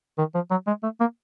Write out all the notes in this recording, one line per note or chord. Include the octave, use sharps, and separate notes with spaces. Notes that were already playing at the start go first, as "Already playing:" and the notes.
D#3
F3
F#3
G#3
A3
A#3